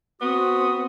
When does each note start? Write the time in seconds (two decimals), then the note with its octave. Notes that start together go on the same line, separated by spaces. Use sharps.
0.21 B3 C4 F#4 D#6